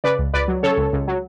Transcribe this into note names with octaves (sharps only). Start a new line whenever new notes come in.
C#3 B4 D5
C#2
C#2 B4 D5
F#3
C#3 A4 C#5
C#2
C#2
F#3